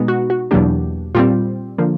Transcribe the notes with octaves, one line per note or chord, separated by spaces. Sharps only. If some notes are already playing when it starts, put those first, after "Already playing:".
Already playing: B2 G#3 B3 D#4
F#4
F#4
E2 B2 F#3 A#3 D4 G4
A#2 G3 C4 F4
D3 F3 A#3